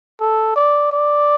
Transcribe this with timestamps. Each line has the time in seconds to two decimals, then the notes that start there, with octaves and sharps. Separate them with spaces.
0.21 A4
0.56 D5
0.92 D5